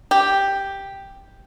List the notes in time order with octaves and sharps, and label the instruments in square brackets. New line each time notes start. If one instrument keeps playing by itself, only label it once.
[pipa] G4